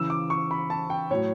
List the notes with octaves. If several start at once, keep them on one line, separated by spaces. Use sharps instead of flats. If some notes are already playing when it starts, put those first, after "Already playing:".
Already playing: C#3 E3 E6
D6
C#6
B5
A5
G5
A2 F#3 C#5